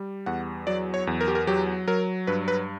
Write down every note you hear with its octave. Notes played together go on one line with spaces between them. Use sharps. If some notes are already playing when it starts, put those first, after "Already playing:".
Already playing: G3
E2 F#5
F#3 D5
C#5
E2
A#4
G4
A#4
F#3 G4
F#3 A#4
G2 B4
B4